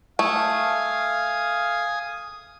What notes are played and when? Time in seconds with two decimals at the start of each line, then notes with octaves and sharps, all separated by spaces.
0.19 A3 F5 G#5 D#6